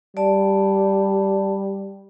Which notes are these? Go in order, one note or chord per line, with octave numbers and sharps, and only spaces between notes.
G3 D5 A5